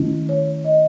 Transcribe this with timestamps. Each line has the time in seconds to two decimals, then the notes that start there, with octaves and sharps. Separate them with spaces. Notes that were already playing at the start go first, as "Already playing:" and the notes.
Already playing: D#3 A3 C#4 E4
0.29 C#5
0.65 D#5